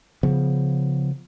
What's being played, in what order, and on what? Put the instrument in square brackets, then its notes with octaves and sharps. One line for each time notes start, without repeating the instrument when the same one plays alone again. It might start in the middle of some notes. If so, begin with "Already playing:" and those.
[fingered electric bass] C#3 F3 B3